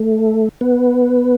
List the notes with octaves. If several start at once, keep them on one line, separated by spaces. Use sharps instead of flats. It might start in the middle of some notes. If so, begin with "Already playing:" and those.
Already playing: A3
B3